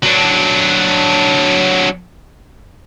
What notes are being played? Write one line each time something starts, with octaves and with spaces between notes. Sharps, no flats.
F#3 D4